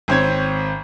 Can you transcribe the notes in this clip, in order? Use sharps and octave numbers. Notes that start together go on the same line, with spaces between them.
G#1 C4 C#5 G#6